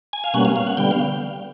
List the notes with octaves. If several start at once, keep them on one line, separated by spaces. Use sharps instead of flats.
G#5
F5
B2 G3 A#3 C#4 F#5
F5
F5
F#5
D3 G3 B3 G5
F5